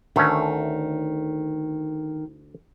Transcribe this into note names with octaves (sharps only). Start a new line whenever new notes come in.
D2 D#3 A3 C#4